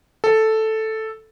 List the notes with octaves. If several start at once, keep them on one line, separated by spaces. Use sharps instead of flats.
A4